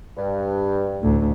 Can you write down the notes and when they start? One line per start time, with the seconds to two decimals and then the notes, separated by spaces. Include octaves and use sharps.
0.17 G2
1.00 A1 D2